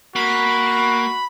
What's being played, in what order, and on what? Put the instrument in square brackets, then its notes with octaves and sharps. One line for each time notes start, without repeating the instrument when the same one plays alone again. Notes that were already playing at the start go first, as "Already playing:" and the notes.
[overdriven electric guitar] A#3 [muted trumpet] F#4 [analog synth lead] B5